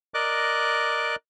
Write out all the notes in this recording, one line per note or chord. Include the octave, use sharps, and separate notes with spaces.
A#4 D5 D#5 D6 F#6